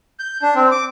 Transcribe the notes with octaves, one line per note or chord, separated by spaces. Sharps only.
G6
D4
C4
D6